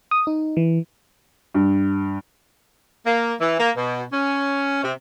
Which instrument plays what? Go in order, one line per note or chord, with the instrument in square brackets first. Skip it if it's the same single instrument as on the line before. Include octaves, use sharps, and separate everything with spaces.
[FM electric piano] D#6
D#4
E3
[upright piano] G2
[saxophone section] A#3
E3
A#3
B2
C#4
C3